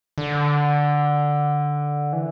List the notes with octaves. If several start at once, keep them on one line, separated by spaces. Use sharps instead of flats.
D3
E3